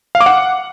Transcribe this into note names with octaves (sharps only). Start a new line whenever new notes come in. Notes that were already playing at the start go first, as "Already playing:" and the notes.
F5
D6
F#5